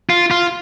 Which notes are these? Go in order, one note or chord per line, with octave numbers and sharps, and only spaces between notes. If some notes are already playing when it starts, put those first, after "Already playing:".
F4
F4